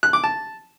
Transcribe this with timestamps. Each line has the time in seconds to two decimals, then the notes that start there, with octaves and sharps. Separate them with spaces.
0.03 F#6
0.13 D6
0.24 A5